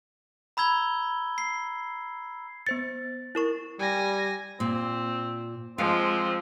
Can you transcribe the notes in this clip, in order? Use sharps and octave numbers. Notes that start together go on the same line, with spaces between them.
A#5 B5 E6 G#6 G7
C7
B3 C5 A6 C#7
E4 A#4 C#6
G3 G#5 A#6
A#2 C4
F3 G#3 C4 F5